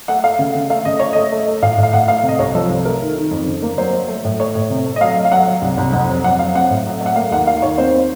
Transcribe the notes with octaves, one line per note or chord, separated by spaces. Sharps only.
A3 F#5
A3 F5
C#3
C#3
A3 F5
C#3 D#5
A3 C#5
A3 D#5
A3
A3
A2 F5
A2
F5
A2 F#5
A3 F5
C3
D#5
C2 C#5
F3 A4
C2
A3 A#4
D#3
D#3
F2
C#3
A#3
F#3 C5
F#3
A3
A2
A3 C#5
A2
C3
A3
D#5
F#3 F5
A3
F5
F#3 F#5
F#3
C2
C2
F2 F#5
F#3
F2 F#5
F#3 F5
C4 F#5
A2
F#3
A3
F#5
A#3 F5
D#2 F#5
A#3 F5
D#2 C#5
C4 C5
C4